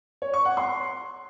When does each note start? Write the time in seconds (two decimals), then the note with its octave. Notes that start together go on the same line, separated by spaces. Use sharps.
0.22 C#5
0.34 C#6
0.45 F#5
0.57 C6